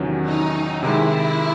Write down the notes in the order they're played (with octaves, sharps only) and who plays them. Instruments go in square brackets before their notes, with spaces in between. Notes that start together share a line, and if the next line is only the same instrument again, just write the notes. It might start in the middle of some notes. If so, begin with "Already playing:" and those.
Already playing: [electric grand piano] E2 C3 D#3 F#3 C#4
[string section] D#4
[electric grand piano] C3 D#3 G#3 [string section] E4